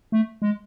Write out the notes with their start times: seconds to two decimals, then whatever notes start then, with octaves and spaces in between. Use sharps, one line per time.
0.12 A3
0.42 G#3